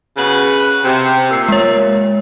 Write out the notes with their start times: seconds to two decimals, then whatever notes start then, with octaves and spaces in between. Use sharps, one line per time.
0.17 C#3 F#4 B4
0.85 C3
1.31 A#2 E6 C7
1.49 G#3 C#5